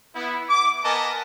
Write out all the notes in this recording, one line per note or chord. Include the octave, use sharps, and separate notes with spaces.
B3 E4
D6
B3 A#4 B4 D#5 G#5 A5